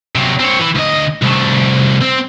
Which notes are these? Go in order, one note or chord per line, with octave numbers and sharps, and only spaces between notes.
C3 F#3
C4 C#5
E3
D2 D#5
C2 A3
C4